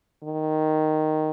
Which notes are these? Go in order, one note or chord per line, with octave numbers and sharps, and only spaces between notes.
D#3